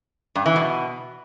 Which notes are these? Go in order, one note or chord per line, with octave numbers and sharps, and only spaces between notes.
G2
E3
B2